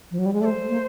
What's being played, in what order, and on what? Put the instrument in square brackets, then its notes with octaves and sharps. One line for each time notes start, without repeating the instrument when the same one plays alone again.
[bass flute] F3
F#3
G3
G#3
[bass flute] A3 [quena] D5
[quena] C5
[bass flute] A#3